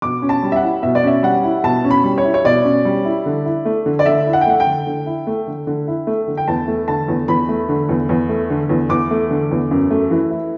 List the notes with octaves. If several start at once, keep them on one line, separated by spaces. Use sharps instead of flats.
B2 D6
C#4
A5
G3
E5
F#5
E4
B2 E5
D5
C#4 E5
G3 F#5
E4
B2 A5
C#4
B5
G3
C#5
E4
C#5
B2 D5
C#4
G3
E4
D3
E4
A3
D3
D5
D3 E5
E4
F#5
G5
A3 F#5
G5
D3
D3
E4
A3
D3
D3
E4
A3
D3
G5
E2 A5
A3
D3 A5
E2
E2 B5
A3
D3
E2
E2
A3
D3
E2
E2 D6
A3
D3
E2
F#2
A3
E3
E4